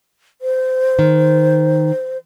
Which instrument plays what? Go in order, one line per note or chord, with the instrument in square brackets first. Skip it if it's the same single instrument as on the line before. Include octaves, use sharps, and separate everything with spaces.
[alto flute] C5
[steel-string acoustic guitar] D#3